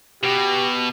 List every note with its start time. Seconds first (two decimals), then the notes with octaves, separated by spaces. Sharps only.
0.23 B2 G4